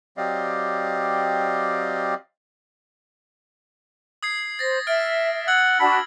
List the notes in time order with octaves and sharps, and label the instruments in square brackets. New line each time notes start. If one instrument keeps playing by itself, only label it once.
[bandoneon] F#3 C4 G4 D5 D#5 F5
[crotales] D#6 G#6 C7
[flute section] C5 [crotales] A6 A#6
[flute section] E5 [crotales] F6 A6 D7
[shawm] F#5 [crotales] E6 G#6 F#7
[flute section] D4 F#4 A5 [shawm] B5